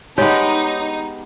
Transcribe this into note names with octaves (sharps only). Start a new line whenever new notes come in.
G#3 B3 D#4 G4 C#5